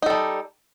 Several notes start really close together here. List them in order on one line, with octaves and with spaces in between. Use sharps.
D#4 A4 G3